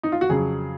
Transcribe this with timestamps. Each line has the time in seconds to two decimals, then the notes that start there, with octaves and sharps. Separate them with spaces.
0.03 D#4
0.12 F4
0.21 F#4
0.29 F2 C#3 F#3 G#4